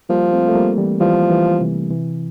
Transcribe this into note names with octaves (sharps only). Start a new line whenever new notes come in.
F3 G3 A#3
A3 C4
A3
G3 A#3
E3 G3
E3 F3 G3
E3 G3
C3 E3
C3 E3